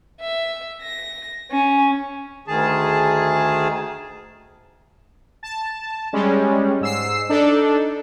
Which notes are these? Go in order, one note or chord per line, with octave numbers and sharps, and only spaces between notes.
E5
A#6
C#4
D2 D#3 G#4 A5
A5
G3 G#3 C#4
G#2 E6 C7
D4 D#4 A4